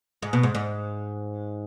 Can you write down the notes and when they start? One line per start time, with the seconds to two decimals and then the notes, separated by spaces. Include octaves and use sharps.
0.22 G#2
0.33 B2
0.43 G#2
0.55 G#2